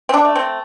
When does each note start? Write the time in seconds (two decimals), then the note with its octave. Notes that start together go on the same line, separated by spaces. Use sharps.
0.09 C4
0.14 D4
0.25 A3
0.36 C4